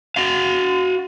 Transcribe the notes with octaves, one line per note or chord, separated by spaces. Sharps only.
F#4 F5